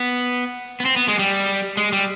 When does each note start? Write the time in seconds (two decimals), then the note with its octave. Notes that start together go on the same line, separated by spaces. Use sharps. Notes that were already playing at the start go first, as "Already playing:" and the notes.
Already playing: B3
0.80 B3
0.85 C4
0.96 B3
1.08 G#3
1.19 G3
1.77 G#3
1.92 G3